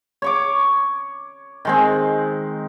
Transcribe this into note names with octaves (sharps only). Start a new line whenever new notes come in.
C#5 C#6 D6
D#3 G#3 C4